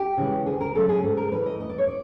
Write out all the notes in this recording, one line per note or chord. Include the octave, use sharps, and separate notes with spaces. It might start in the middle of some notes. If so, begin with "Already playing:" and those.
Already playing: G4
C#3 E3 G#3
D2 G#4
A#4
C#3 F#3 A3 A4
G#4
G#2 A4
A#4
E3 A3 B4
D#5
E2 D#5
D5
C#5
D5